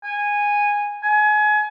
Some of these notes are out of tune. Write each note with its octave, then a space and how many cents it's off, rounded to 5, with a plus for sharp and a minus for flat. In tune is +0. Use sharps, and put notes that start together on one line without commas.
G#5 -10
G#5 +30